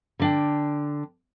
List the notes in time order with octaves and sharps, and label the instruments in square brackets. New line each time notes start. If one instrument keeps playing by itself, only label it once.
[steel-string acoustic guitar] D3 D4 G5